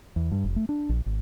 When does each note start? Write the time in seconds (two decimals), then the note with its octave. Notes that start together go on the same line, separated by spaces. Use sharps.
0.16 E2
0.32 G2
0.44 F1
0.56 A3
0.69 D4
0.89 A#1
1.06 G#1